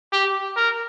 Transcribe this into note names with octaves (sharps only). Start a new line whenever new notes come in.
G4
A#4